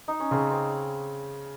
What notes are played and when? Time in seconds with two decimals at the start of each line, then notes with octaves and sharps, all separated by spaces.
0.08 D#4
0.20 C#4
0.31 C#3 C4
0.51 C4